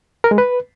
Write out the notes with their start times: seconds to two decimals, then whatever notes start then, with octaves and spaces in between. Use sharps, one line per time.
0.24 A#4
0.31 G#3
0.38 B4